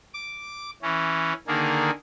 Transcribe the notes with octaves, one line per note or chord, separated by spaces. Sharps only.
D6
E3 C#4
D3 D#3 A#3 G#4